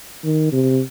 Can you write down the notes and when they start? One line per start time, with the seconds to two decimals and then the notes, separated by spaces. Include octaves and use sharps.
0.24 D#3
0.52 C3